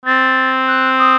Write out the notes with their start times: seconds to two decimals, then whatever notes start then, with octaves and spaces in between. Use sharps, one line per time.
0.06 C4 A6
0.68 F#6
0.98 D#6